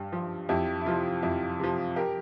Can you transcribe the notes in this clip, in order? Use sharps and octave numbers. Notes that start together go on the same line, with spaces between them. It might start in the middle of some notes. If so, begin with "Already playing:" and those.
Already playing: G2 G4
F3
F2 E4 G4
E4
C3 F3 F4
F2 E4 G4
C3 F3
G4 A#4